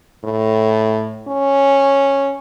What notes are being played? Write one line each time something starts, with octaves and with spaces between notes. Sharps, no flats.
A2
C#4